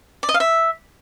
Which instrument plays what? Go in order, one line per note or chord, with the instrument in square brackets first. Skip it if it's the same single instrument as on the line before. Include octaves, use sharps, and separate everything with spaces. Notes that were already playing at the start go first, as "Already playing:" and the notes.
[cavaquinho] D5
D#5
F5
E5